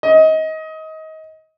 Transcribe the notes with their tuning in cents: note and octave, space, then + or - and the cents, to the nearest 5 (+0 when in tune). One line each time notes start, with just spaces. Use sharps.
D#5 +25